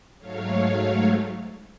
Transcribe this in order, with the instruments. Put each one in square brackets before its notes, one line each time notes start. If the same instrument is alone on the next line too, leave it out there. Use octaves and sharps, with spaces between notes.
[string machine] G#2 F#3 A3 C#5 F5